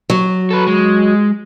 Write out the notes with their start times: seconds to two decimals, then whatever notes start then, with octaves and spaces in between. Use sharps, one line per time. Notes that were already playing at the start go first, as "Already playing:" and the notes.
0.10 F#3
0.50 A4 B4
0.67 G#3